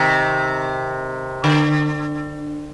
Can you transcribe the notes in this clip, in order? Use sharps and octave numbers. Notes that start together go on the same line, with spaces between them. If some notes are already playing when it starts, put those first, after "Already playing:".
Already playing: C3 D#3
D3